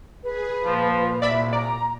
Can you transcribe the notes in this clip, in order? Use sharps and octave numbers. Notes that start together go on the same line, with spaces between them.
G#4 B4
A#2 F3
C2 D5 E5 B5
D5 A#5